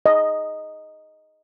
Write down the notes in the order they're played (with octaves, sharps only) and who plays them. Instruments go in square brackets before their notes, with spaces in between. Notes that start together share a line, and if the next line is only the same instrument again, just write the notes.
[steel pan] D#5